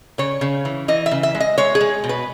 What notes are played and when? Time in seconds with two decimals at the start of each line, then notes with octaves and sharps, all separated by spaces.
0.18 C#3 C#5
0.41 C#3
0.65 E3
0.88 E3 D#5
1.06 E5
1.11 C#3
1.23 E5
1.35 G#3
1.40 D#5
1.58 G#3 C#5
1.75 G#4
1.81 G#3
2.04 B2
2.09 B4